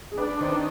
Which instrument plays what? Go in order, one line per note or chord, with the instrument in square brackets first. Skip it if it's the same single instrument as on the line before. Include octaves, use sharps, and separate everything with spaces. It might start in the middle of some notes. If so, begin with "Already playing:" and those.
[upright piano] G#4
[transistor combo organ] D4 [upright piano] B4
[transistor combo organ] D#3 [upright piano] C5
[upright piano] B4